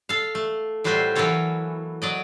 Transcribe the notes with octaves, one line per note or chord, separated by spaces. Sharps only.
A4 F5
A3
A2 G3 F4 F#4 C5 E5
E3 F#3 A#3 F#4 A4 C#5
F#3 D5 D#5